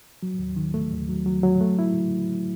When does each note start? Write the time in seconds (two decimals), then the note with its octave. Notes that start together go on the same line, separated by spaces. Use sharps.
0.23 F#3
0.39 D#2
0.57 D#3
0.74 A3
0.92 D#2
1.09 F#3
1.26 F#3
1.43 F#3
1.61 A3
1.79 E4